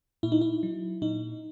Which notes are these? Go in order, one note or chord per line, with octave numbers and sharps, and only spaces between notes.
A#2 E4
D#4
E4
F#3
A#2 D#4